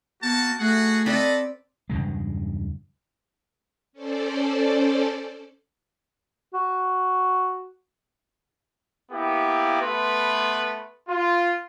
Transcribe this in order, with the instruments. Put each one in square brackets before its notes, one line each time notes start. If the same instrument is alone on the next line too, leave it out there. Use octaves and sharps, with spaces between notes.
[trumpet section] A#3 F#4 A5 [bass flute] B3
[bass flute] A3 [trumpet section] F#4 G#4 F#5
[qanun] C4 B4 D5 [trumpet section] A4 D#5 B5
[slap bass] E2 G2 C#3 G#3
[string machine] C#4 A4 C5 D5
[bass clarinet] F#4
[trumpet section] A#3 B3 E4 G4
A3 B3 B4 C6
F4